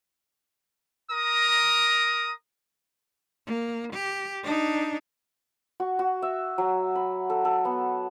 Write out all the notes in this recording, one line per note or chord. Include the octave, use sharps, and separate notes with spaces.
A#4 A#5 D#6
A#3
G4
D4 D#4
F#4
F#4
E5
F#3
B5
A4
A4
B3